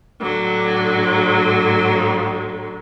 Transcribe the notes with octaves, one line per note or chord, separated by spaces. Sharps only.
A2 D3 F#3